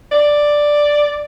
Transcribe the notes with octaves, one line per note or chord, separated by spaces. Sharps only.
D5